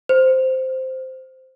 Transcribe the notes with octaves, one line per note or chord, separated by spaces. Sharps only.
C5